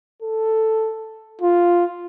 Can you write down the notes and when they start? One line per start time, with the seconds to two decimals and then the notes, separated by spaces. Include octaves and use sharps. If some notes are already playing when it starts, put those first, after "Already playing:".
0.22 A4
1.41 F4